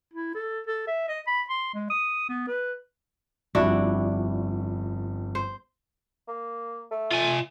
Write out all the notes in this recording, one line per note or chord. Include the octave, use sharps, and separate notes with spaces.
E4
A4
A4
E5
D#5
B5
C6
G#3
D#6
B3
B4
G1 F2 G3 D4 E4 F#4
C5
A#3
A3
F4 G#5